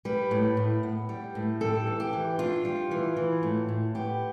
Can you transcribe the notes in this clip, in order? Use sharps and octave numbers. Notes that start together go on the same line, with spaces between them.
G3 B4
A2
A2
B3
G3
A2
G3 A4
E3
G4
E3
D4 F4
G3
E3
E3
A2
A2
B3 G4